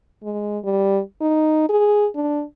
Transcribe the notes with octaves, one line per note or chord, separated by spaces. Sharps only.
G#3
G3
D#4
G#4
D4